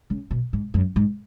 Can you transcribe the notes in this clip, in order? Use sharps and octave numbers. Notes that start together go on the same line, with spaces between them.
C#3
B2
G#2
F#2
G#2